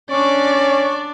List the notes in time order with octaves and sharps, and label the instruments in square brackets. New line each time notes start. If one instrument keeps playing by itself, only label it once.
[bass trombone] C#4 [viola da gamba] D4 [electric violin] D5 [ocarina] C#6